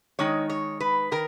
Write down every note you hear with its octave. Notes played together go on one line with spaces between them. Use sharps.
D#3 G#3 D#4 C#5
C#5
B4
D#3 A#4